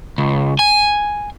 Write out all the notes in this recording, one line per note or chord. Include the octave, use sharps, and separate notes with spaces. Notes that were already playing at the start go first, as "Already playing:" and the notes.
C#2
G#5